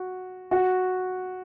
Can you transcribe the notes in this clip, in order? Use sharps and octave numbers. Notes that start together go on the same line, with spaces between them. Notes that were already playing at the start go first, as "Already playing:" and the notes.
Already playing: F#4
F#4